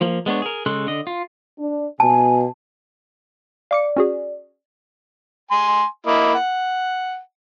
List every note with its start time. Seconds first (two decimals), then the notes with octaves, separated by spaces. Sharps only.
0.01 F3 A#3
0.26 G#3 B3 D4 C#5
0.42 G#4 A#4
0.66 C#3 G#3 A4 C6 F#6
0.87 D3 D#5
1.07 F4
1.59 D4
2.00 B2 G#5 A5
3.71 D5 F5 D6 C#7
3.96 C#4 F#4 G#4
5.51 G#5 C6
6.06 A#3 E4 D#5
6.34 F#5